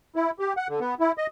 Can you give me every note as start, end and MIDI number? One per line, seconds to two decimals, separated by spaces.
0.16 0.31 64
0.39 0.53 67
0.57 0.68 78
0.69 0.80 50
0.80 0.94 59
1.00 1.12 64
1.18 1.27 75